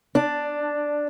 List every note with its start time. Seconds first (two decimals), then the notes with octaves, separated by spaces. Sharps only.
0.15 D4